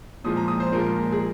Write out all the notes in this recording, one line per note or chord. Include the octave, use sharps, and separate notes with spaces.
A#2 F3 G#3 D#6
A#5
D#6
C5
A#2 F3 G#3 A#4
G#4